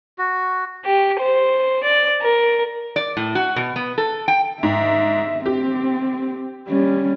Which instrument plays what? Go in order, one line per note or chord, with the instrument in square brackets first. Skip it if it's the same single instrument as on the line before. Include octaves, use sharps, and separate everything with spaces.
[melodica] F#4
[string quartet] G4
C5
D5
A#4
[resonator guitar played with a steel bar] D5
A2
F#4
B2
B3
A4
G5
[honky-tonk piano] G#2 [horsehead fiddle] E5
[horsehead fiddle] C4 [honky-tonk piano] G4
[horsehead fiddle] G3 C#4